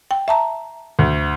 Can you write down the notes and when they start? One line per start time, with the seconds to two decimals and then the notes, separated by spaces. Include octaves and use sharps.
0.11 G5
0.28 E5 A5 A#5
0.99 D2